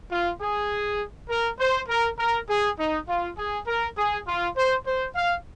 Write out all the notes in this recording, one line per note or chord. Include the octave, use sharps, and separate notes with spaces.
F4
G#4
A#4
C5
A#4
A#4
G#4
D#4
F4
G#4
A#4
G#4
F4
C5
C5
F5